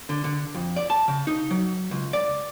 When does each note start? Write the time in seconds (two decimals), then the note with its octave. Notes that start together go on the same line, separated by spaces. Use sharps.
0.09 D3
0.24 D3
0.55 F2
0.76 D5
0.90 A5
1.08 C#3
1.27 D#4
1.51 F#3
1.91 C#2
2.13 D5